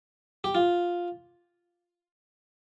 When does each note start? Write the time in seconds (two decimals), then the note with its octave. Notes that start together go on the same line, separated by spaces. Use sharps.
0.44 G4
0.55 F4